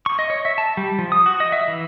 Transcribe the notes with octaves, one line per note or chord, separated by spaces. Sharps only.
C#6
D#5
C#5
E5
A5
G3
F3
D#6
F#4
D#5
E5
E3